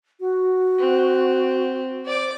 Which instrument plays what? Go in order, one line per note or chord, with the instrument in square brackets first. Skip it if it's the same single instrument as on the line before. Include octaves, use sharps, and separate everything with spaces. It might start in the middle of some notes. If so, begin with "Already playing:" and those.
[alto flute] F#4
[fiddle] C4
[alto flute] C5 [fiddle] D5 D6